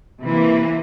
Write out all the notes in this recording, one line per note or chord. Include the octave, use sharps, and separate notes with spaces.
C3 E3 A#3